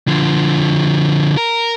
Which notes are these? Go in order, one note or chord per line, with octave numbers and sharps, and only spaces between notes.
D3 F3
A#4